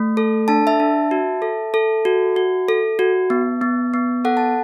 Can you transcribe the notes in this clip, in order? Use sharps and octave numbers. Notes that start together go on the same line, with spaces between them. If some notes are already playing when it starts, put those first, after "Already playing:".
Already playing: A3
A4
D4 A5
E5 A5
D4
F#4
A4
A4
F#4
F#4
A4
F#4
B3
B3
B3
A4 F#5
A5